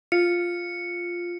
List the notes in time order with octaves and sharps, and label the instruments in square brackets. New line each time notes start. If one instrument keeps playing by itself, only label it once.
[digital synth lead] F4 [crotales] C#7